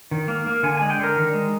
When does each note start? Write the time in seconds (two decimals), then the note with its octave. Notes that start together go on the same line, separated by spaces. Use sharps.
0.11 D#3
0.28 A#3
0.46 A#3
0.63 D3 G#5
0.77 G#3 G#5
0.90 G5
0.99 D3 A#4
1.17 D#3
1.33 G#3